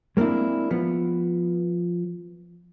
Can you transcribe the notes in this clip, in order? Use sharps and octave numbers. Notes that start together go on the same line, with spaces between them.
G#3 A#3 C4 D4 E4
F3 B3